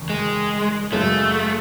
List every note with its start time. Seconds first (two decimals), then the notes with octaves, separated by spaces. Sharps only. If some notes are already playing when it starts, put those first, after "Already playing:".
Already playing: F#1 E2 D#3
0.10 G#3
0.92 F#2 C#3 G#3 A3